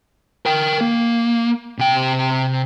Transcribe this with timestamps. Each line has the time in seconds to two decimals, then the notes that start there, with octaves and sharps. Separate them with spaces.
0.46 A#4 G5
0.81 A#3
1.78 C3 G5